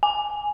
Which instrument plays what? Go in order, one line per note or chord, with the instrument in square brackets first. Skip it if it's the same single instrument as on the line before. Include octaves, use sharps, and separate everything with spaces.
[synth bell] G#5